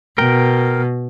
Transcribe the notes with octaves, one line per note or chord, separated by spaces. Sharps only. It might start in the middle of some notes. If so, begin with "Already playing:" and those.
B2 A#4 G5